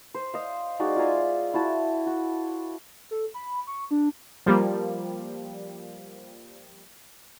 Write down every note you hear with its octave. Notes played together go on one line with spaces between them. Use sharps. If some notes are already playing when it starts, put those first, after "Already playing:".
C5
D#5 F5
G#3 D#4 F#4 D5
F4 E5 G#5 A#5
E4 F#4 A5
F#4
A4
B5
C#6
D4
F3 G3 A#3